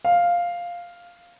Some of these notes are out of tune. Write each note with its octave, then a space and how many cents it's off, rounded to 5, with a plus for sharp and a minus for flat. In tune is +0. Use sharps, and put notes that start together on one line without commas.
F5 +0